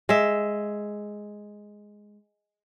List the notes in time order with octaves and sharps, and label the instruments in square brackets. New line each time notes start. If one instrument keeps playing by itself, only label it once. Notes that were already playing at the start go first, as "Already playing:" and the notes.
[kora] G#3 E5